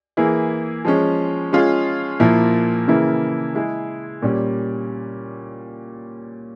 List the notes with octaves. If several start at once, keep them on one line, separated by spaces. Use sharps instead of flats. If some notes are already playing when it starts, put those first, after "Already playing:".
E3 A#3 E4 G#4
F3 G#3 C#4
G#3 C#4 F4 G#4
A#2 F3 A#3 E4
C#3 E3 A#3 E4
G#3 E4 G#4
A#2 G3 C#4